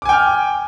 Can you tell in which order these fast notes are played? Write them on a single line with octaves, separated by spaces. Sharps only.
D6 G#5 G5 F6